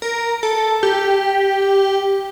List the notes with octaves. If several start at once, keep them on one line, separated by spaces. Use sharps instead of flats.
A#4
A4
G4